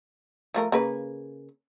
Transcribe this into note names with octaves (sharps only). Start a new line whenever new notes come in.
F3 A3 A#4
C#3 A#3 B4